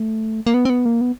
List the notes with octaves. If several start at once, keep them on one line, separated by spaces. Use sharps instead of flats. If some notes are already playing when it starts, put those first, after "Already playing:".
Already playing: A3
A#3
B3
C4
B3
A#3
B3